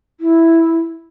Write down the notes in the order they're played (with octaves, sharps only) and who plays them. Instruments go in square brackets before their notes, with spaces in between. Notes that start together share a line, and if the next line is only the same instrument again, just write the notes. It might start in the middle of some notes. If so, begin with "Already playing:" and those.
[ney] E4